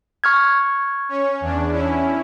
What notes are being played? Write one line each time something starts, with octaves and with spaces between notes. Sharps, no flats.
C#6 F6 G#6
C#4 C#5
E2 D4
C#4 E4